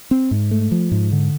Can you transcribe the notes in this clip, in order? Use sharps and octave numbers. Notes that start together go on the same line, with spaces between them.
C4
G#2
A3
F3
G#2
D3